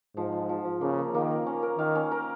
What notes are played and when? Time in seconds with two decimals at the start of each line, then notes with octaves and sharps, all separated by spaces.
0.16 G#2 F3
0.32 F3
0.49 F3
0.65 F3
0.81 C#3 A#3
0.98 A#3
1.14 D#3 A#3
1.31 A#4
1.46 C#4
1.63 A#4
1.78 D#3 F5
1.95 C#4
2.11 A#4